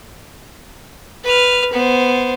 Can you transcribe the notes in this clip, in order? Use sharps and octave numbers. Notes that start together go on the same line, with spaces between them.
B4 F6
B3 C5